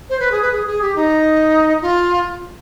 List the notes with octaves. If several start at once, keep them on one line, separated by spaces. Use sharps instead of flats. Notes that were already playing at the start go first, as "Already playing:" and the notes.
C5
B4
G#4
B4
G#4
G#4
G4
D#4
F4